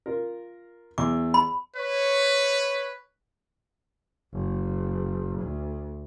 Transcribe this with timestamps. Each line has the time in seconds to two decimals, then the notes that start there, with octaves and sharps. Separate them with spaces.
0.06 F4 A#4
0.98 E2 D6
1.34 B5
1.76 B4 C#5
4.33 F#1
5.40 D2